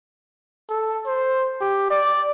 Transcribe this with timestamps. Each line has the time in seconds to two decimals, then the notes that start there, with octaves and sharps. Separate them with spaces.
0.69 A4
1.06 C5
1.61 G4
1.91 D5